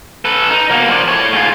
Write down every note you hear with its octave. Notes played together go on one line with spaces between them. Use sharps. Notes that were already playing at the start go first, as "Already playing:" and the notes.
A4 B4
D#4
B2 A#3
F3 D5
A2 C#5
G#2 F4